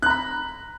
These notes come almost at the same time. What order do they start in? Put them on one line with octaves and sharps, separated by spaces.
F#6 A#5 B5